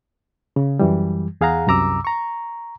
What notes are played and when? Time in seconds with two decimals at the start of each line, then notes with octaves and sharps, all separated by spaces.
0.56 C#3
0.79 F#2 E3 G3
1.41 E2 G#4 F5 F#5 A#5
1.67 C2 F#2 C3 A#5 D6 E6
2.05 A#5 C#6